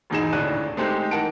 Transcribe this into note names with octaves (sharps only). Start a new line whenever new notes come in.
E1 E2 G#2 D#4 G#4 E7
D#1 D2 A2 D4 F#6 D#7
G#3 A3 C4 D#4 G4 C5
E3 D#4 A#4 F#5 A5 D7